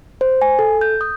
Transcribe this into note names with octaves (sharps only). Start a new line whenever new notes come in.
C5
G#5
A4
G6
D#6